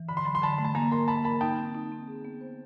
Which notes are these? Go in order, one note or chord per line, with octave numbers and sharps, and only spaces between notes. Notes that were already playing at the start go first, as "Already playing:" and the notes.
Already playing: E3
D3 B5
C6
F#3 B5
C6
D3 A5 B5
A3
A5
A#3 G#5 A#5
A#4 A#5 C6
A#3 A5 B5
A#4 A5 B5
D#4 G5 A5
C4
D#4
C4
G#4
B3
C5